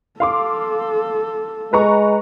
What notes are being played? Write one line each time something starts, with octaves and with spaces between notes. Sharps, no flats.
A4 F5 C6 D6
G#3 B4 A#5 C#6